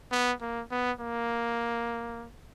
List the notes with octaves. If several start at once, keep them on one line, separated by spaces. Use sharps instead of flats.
B3
A#3
B3
A#3